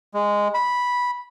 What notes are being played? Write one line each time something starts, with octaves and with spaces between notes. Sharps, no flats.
G#3
B5